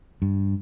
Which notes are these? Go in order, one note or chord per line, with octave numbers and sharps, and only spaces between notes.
G2